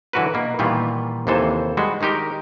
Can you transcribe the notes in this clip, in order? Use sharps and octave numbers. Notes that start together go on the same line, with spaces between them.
D3 E3 F#3 F#4 A#4 B4
B2 A#3
A#2 D#3 E3 G3 B3 F4
D#2 C3 E3 A4 C5 G#5
G3 G#3 F#4
D#3 G#3 D#4 G4 A#4